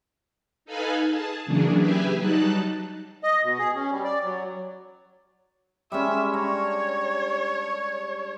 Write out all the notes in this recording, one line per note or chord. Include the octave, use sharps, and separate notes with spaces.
D#4 A4 B4 F5 G#5 B5
G#4 A5
C#3 E3 F#3 A#3 D4 G#4
G4 G#4 B4 E5 G#5
F#3 G3 D#4 A5 F#6
D#5
B2
G#4
C#4
G3
D5
F#3
G3 G#3 C#4 E5
D4 C#5 A#5 B5